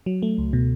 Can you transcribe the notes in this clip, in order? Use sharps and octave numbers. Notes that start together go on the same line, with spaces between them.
F#3
A3
C#2
B2